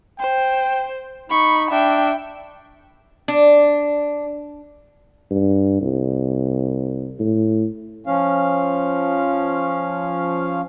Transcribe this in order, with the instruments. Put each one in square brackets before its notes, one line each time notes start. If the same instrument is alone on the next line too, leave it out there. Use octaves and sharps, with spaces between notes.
[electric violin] C5 [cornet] G5
[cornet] D#4 [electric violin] B5 C#6
[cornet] D4 [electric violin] E5 G5
[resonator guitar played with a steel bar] D4
[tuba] G2
C2
A2
[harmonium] F3 C#4 F5